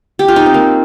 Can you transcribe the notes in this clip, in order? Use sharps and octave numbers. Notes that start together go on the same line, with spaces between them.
G4
F4
D#4
C4
A#3